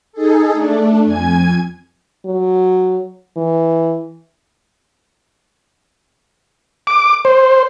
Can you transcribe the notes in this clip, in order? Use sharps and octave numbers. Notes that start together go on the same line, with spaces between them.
D#4 G#4 A4
A3 D4
F2 G#5 G#6
F#3
E3
D6
C5